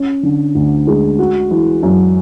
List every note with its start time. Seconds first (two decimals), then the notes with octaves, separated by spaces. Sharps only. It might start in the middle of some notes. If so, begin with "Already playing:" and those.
Already playing: C#4
0.23 D3
0.55 D2
0.87 G#3
1.19 F#4
1.51 E3
1.83 F#2